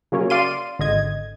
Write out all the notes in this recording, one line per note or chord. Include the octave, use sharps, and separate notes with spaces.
C#3 F#3 A#3 C#4
D5 F5 C6 D#7
G#1 D3 D#5 G#6